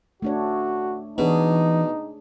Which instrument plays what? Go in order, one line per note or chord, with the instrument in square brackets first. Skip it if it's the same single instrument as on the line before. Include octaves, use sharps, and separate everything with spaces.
[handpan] A3 D4 C#5 [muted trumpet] F#4
[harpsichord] B2 [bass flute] E3 [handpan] D4 G#4 C#5 [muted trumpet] D#4